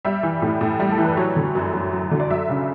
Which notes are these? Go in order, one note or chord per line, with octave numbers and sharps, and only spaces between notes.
G3 E5
E3
A2
A2
G3
A4
E3
B4
F#3 C#5
D3
F#2
F#2
F#3
D3
D5
F#3 E5
C#3